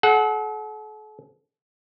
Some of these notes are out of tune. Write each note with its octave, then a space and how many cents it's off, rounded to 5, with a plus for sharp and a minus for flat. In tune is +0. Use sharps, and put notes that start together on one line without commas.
A4 -45 F#5 +0